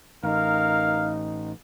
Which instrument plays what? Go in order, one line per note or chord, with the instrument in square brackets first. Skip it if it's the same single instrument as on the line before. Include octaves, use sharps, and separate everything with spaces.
[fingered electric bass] A1 [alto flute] D#4 [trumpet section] A#4 F5